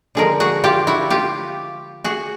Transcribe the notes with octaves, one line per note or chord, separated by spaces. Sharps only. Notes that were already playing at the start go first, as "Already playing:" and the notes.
D3 F3 G#3 G#4 A#4
F#4 G#4
F4 G4
E4 F#4
F4 G4
F#4 G#4